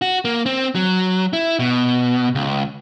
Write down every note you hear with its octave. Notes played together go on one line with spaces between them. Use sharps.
F#4
A#3
C4
F#3
E4
B2
C#2